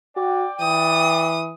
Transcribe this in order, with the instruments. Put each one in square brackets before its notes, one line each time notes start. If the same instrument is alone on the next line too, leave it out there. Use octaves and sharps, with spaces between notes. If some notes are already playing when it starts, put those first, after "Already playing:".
[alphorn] F#4 [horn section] D5 G5
[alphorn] E3 [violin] D#6